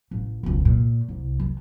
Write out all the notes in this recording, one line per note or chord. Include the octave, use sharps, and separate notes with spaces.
A1
E1 C#2
A#2
C2
D#3